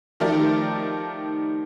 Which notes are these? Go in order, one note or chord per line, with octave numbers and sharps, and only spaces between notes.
D#3 F3 A3 G4 A#4 D5